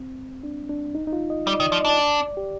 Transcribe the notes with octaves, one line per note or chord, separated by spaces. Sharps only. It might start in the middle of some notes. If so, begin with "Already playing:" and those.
Already playing: C4
D4
D4
D#4
D#4
F4
D#5
G3 D5
D#5
D#3 D5
F3 D5
D4 D#5
D5
G4